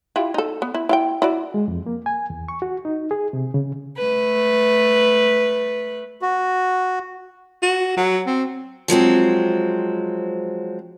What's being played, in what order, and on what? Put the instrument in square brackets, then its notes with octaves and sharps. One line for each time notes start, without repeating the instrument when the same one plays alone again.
[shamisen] E4 F4 G4
D#4 A4
B3
E4
E4 F5 G5
E4 F#4 D5
[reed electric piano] G#3
F2
A#3
G#5
E2
C#6
F#4
D#4
G#4
C3
C#3
[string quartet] A3 B4
[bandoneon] F#4
[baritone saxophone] F#4
F#3
C4
[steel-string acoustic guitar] F3 F#3 G#3 C4